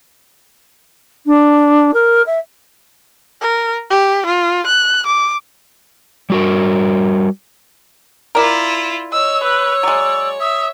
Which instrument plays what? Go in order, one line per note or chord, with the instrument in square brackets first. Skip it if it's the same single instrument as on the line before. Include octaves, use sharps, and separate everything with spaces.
[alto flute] D4
A#4
E5
[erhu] A#4
G4
F4
F#6
D6
[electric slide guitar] G3 F#4 A#4
[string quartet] E4 F4 [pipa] A#4 D5
[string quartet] C#5 [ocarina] D#5 [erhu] E6
[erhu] B4 [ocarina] E6
[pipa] F#3 G#3 [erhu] D5
[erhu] E5 [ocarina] D#6